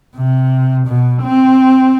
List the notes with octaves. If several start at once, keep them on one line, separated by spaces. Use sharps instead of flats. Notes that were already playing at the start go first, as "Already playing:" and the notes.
C3
B2
C4